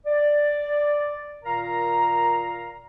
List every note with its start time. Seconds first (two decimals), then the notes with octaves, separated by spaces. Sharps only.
0.06 D5
1.44 A#2 D#3 A#4 F5 A#5